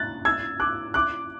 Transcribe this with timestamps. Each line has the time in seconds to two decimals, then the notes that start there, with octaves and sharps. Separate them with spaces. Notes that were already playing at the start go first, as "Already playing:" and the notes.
Already playing: F#6 A6
0.25 E6 G#6
0.60 D6 F#6
0.94 D6 F#6